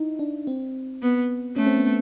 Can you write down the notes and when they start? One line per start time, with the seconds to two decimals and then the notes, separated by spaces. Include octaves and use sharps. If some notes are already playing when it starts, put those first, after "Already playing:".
Already playing: D#4 E4
0.19 D4
0.47 C4
1.02 B3
1.56 A3 C#4
1.67 C4
1.77 B3